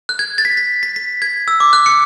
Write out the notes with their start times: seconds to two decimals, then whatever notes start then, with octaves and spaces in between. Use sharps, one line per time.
0.09 F#6
0.19 G#6
0.38 A6
0.45 B6
0.57 B6
0.83 B6
0.96 B6
1.22 G#6
1.48 E6
1.60 D6
1.73 F#6
1.86 C#7